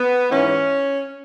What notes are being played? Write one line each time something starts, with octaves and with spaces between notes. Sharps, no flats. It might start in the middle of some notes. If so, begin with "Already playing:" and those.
Already playing: B3
G#2 E3 C#4